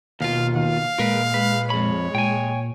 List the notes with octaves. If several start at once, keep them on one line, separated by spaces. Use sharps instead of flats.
D#2 B2 F4 F5
D#3 F5
A#2 G#3 A#4 B4
B4
F2 C#5 B5
A#2 G5 G#5